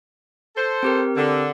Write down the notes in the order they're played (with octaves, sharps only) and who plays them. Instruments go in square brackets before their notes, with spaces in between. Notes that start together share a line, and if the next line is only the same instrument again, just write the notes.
[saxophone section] A4 C5
[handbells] C4 G4 A#4
[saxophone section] D3